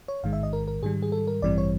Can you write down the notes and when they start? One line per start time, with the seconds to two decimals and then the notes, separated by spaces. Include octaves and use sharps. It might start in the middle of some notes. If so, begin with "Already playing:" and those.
0.08 C#5
0.23 A1 G#2 D#3 G#3 F5
0.33 E5
0.43 D#5
0.53 A#4
0.68 A#4
0.83 G#2 D#3 G3 G#4
1.02 G#4
1.12 A4
1.27 A#4
1.42 A1 G2 E3 G3 C4 D5
1.58 C#5